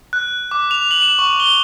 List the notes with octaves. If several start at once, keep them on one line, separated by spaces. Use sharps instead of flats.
F#6
D6
F7
F#7
E7
C#6
G7